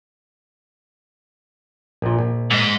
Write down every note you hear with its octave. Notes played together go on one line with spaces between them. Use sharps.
A#1 A#2
A#1
G#2 D#5